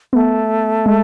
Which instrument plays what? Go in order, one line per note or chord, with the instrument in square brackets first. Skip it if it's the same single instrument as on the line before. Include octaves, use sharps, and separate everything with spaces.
[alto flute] A3 [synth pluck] B3
[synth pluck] G#3